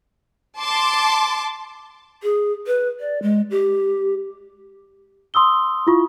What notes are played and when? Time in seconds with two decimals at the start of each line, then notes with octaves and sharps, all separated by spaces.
0.60 A5 C6 D6
2.23 G#4
2.67 B4
3.00 D5
3.22 G#3
3.51 G4
5.34 C6 D#6 E6 G7
5.87 E4 F4 C#6